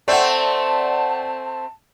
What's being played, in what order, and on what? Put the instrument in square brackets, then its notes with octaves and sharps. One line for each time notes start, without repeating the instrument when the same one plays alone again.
[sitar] A3 C4 [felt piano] D5 F#5 [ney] A5